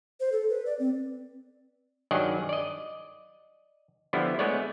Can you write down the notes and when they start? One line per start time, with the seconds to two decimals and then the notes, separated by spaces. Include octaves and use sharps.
0.20 C5
0.32 A4
0.49 B4
0.66 D5
0.79 C4
2.11 G2 D#3 F#3 G#4 D5 D#5
2.49 D5 D#5
4.13 D3 F3 G3 B3 E4
4.39 G#3 A3 B3 C#5 D5